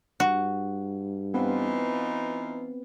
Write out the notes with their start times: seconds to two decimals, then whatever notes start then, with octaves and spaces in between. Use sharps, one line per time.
0.20 G2 F#4
1.34 E3 B3 C4 D#4 F4 B4